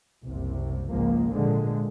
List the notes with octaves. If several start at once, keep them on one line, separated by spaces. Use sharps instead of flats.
F#1 C2 C3
G#1 C#2 F3 G#3 A#3
A#2 D3 F3 G#3